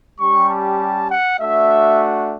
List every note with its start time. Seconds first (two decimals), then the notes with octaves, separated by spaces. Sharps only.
0.20 G3 C#4 G4 C#6
0.50 A5
1.10 F#5
1.40 A3 D4 F#4 E5